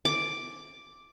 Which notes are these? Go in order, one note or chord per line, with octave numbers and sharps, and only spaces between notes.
D6